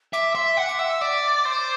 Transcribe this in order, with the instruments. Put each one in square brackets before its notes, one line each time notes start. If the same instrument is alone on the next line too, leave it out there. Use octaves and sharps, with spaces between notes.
[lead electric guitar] E5 [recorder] D6
[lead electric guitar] E5 [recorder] C6
[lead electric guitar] F#5
[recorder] D6
[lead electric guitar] E5 [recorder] E6
[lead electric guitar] D5 [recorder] D6
[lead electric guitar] C5